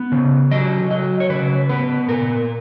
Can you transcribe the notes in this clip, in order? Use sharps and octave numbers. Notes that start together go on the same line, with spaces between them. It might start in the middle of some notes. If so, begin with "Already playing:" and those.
Already playing: B3
C#3
F#3 D#5
F#3 D#5
C#5
C#3 B4
B3 B4
A#2 A#4